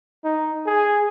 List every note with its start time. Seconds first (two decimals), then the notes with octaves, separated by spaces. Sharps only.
0.24 D#4
0.66 G#4